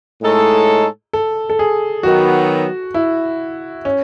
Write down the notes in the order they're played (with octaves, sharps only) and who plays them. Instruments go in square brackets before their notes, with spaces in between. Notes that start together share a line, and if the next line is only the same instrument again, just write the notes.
[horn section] A2 G#3 D#4 A4 C#5
[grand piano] A4
A4
G#4
[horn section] D#3 F#3 B3 [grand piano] F#4
[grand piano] E4
C#4